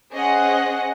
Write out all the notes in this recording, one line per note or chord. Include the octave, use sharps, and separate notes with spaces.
C#4 G#4 C5 D#5 F#5